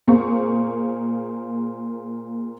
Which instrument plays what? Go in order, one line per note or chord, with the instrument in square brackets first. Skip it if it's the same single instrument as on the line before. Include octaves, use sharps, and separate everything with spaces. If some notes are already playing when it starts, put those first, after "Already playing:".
[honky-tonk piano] A#2 A#3 G#4 C5 C#6